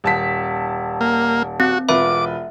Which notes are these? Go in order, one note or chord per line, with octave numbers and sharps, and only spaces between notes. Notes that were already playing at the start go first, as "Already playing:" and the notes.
D#1 A5 B6
A#3
C4 F#4
E1 F4 B4 E5 D6